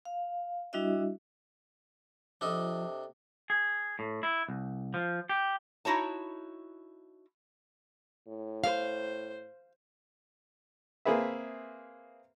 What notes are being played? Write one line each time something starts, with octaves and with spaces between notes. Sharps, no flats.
F5
G3 D4 E4 F#4 D#5 E5
C3 F3 D4 A4 D#5
G#4
A2
E4
C2
F3
G4
D#4 E4 F#4 C#5 A5
A2
C5 F5
A#3 C4 G#4 B4 E5